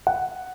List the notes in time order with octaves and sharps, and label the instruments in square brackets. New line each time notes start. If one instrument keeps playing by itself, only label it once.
[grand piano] F#5